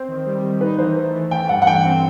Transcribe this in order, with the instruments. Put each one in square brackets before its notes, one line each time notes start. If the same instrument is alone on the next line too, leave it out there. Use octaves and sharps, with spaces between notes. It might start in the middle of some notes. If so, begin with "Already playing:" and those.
Already playing: [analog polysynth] C4 [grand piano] C5
[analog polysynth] D#3
G3
D#3
[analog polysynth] D#4 [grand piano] B4
[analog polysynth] E3 [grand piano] C5
[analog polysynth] A3
E3
[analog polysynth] A3 [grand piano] G5
[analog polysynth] G2 [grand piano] F#5
[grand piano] F#5
[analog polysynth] E3 [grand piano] G5
[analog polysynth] C4